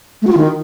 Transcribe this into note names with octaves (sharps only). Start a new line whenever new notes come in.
A3
F#4
F4
D#3